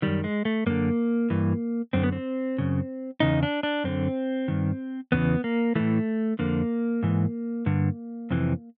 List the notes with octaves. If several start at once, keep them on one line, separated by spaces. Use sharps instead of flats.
F#2 D#3 G3
G#3
A3
F#2 D3 A#3
G2 E3
F#2 D3 C4
B3
C4
F#2 C#3
E2 C#3 D#4
D4
D4
F#2 D3 C4
G2 D#3
E2 C#3 E3 B3
A#3
A2 E3 A3
F2 D3 A#3
G#2 E3
G2 D3
F2 C3 E3